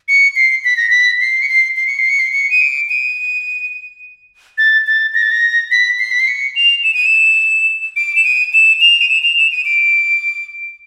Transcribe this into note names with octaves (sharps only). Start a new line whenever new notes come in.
C#7
C7
B6
A#6
B6
C7
C#7
C7
C7
C#7
C7
C#7
C7
C#7
D#7
D7
D#7
A6
A6
A#6
A6
A#6
B6
C7
B6
C7
C#7
F7
E7
D#7
E7
D7
E7
D#7
E7
F7
D#7
E7
F7
E7
D#7
D7